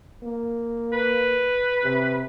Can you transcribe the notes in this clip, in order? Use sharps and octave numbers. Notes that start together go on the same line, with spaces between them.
A#3
B4
C3